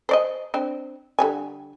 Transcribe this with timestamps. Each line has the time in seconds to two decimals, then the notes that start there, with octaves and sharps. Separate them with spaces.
0.09 C5 D5 D#5
0.54 C4 D4
1.19 D3 G3 G#5